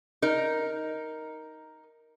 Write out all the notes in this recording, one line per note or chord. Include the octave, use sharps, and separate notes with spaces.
D#4 A#4